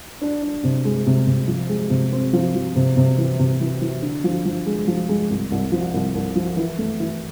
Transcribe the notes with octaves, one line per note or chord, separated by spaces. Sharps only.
D4
D4
C3
G#3
C3
C3
F3
G#3
C3
C4
F3
F3
C3
C3
E3
C3
E3
E3
D3
F3
F3
G#3
F3
G#3
C2
C2
F3
C2
C2
F3
E3
A3
E3